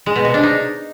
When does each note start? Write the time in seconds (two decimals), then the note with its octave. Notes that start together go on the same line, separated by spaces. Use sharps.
0.06 G#3
0.16 B2
0.25 C3
0.34 D4
0.43 D#4